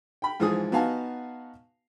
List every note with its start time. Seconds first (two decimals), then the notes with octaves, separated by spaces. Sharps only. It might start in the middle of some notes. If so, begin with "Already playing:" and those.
0.22 G5 B5
0.40 G#2 E3 F3 G#4 D#6
0.72 B3 D#4 F#4 F5 G#5 A5